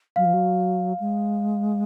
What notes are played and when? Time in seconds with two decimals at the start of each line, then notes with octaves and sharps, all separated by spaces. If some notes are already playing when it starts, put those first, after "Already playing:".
0.16 F#3 F5
0.25 F3
0.34 F#3
1.00 G#3